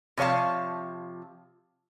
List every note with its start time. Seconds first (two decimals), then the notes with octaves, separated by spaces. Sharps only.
0.17 C3 F3 C#5 F5 A5